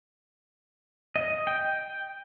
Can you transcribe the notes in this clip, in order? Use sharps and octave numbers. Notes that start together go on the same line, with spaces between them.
D#5
G5